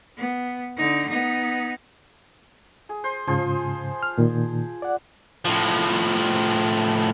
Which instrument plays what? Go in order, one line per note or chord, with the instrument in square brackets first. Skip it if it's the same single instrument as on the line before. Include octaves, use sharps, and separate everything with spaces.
[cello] B3
D3 D#4
B3 D#4
[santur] G#4
C5
[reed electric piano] G#2 C#3 [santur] F3 G#4 C5
[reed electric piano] F6
A#2 D#3
D5 F#5
[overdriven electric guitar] A2 F3